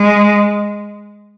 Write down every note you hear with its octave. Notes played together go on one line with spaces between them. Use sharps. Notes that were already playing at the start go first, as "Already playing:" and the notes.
Already playing: G#3